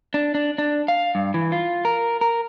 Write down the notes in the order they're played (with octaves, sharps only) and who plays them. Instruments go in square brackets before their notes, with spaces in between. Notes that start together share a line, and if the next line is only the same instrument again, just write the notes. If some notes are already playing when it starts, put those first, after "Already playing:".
[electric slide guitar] D4
D4
D4
F5
G2
E3
F4
A#4
A#4